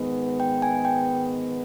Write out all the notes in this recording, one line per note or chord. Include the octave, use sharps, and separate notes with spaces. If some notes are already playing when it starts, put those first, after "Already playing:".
Already playing: G#2 D#3 G#3 B3
G5
G#5
G5